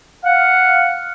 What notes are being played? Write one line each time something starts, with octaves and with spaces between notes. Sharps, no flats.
F5 F#5